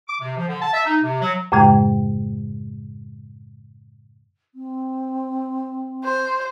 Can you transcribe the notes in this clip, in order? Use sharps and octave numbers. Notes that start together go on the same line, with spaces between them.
D6
C3
F3
D3
A5
E5
D#4
C3
F#3
F#2 A2 C#3 G#3 G5
C4
C5